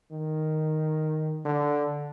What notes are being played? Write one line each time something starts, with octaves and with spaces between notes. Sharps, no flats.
D#3
D3